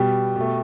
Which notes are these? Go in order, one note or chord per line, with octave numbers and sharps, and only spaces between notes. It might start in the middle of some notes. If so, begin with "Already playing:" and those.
Already playing: B2 G3 G4
B2 A3